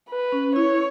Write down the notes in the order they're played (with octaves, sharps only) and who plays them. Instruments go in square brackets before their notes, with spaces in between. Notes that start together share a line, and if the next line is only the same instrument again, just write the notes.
[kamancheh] B4
[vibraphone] C#4
[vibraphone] E4 [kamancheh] C#5